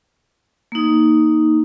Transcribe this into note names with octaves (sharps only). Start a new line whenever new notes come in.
A#3 D#4